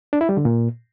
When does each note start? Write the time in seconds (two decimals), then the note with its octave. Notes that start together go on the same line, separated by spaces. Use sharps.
0.13 D4
0.21 E4
0.29 G3
0.37 D3
0.45 A#2